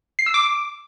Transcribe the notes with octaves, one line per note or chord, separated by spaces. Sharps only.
C7
E6
D6